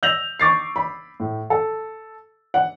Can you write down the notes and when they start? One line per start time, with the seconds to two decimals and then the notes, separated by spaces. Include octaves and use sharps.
0.03 E6 G6 A#6 F7 F#7
0.40 C#6 D6 A6 C7
0.76 B5
1.20 A2
1.50 A4
2.54 F#5